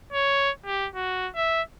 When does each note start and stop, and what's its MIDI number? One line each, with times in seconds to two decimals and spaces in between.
0.13 0.50 73
0.66 0.88 67
0.95 1.29 66
1.35 1.62 76